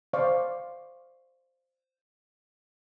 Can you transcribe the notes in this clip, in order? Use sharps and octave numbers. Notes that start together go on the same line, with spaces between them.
C5 D5 F5 C#6